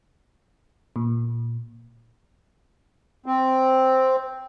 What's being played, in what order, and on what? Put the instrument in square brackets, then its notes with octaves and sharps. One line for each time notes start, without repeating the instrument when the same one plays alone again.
[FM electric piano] A#2
[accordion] C4